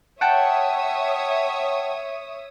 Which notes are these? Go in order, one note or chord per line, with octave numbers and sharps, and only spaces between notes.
C#5 E5 F#5 G5 A5 D#6